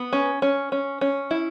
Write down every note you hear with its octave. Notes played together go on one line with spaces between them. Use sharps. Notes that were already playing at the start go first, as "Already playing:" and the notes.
Already playing: B3
C#4
C#4
C#4
C#4
E4